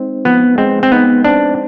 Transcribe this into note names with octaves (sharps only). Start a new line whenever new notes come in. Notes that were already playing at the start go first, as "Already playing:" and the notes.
Already playing: G#3 C4 D#4
F3 B3
G#3 C4
C4
B3 D#4
C4 D4